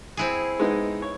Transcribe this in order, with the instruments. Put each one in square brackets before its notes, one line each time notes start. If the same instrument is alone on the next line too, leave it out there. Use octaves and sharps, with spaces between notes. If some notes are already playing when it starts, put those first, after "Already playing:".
[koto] C4 E4 G#4
[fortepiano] G#3 B3 D#4
C#5